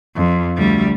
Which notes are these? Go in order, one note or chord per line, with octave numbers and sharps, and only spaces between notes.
F2
D2 G3